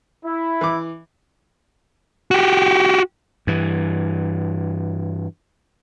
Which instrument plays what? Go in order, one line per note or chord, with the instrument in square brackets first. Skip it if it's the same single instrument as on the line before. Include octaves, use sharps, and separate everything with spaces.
[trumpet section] E4
[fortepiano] E3 D6
[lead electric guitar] F#4 G4
[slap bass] G2 E3